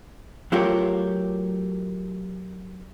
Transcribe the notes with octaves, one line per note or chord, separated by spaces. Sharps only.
F#3 A3 F4 G4 A#4 C#5